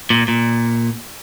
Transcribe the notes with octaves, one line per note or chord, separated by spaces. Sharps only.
A#2
A#2